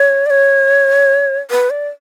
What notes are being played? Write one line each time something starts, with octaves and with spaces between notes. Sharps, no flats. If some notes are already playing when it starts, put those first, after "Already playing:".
Already playing: C#5
D5
C#5
B4
D5